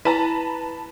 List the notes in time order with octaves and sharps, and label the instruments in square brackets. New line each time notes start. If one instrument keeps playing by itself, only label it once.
[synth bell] E4 [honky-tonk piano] B4 A5 A#5